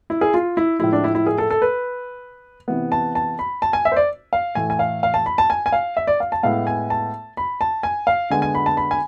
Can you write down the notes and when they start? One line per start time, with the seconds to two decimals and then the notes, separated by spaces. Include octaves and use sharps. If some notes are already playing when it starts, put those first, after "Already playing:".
0.10 E4
0.21 G#4
0.34 F4
0.57 E4
0.80 A2 F3 G#3 E4
0.93 D4
1.04 E4
1.15 E4
1.26 G#4
1.38 A4
1.51 A4
1.62 B4
2.68 C3 E3 B3
2.92 A5
3.15 A5
3.39 B5
3.62 A5
3.73 G#5
3.85 E5
3.92 C5
3.96 D5
4.33 F5
4.55 A2 E3 A3 G#5
4.70 G#5
4.79 F5
5.03 F5
5.14 A5
5.26 B5
5.38 A5
5.50 G#5
5.66 G#5
5.73 F5
5.97 E5
6.07 D5
6.20 F5
6.32 A5
6.43 A2 G#3 B3 F5
6.67 G#5
6.90 A5
7.37 B5
7.61 A5
7.83 G#5
8.07 F5
8.30 D3 G#3 B3 G#5
8.42 G#5
8.55 B5
8.66 A5
8.77 B5
8.91 G#5